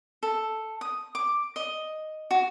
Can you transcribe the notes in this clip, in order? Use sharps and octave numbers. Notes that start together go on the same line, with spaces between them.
A4
D#6
D6
D#5
F#4